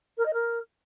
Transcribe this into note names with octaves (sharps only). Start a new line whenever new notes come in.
A#4
D#5
A#4